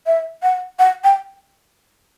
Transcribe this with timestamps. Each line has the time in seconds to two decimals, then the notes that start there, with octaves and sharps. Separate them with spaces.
0.06 E5
0.43 F#5
0.79 F#5
1.04 G5